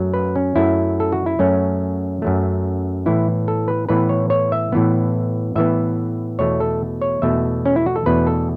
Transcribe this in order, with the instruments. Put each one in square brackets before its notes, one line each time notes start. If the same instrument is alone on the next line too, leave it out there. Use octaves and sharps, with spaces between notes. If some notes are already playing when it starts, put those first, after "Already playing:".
Already playing: [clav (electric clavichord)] F#2 F#3 A3
B4
C#4
F#2 F#3 A3 E4
A4
F#4
E4
F#2 F#3 A3 C#4
F#2 F#3 A3
A2 E3 B3 E4
A4
B4
A2 E3 B3 B4
C#5
C#5
E5
A2 E3 B3
A2 E3 B3 E5
E2 B2 A3 C#5
A4
C#5
E2 B2 A3 E5
C#4
E4
F#4
A4
E2 B2 A3 B4
A4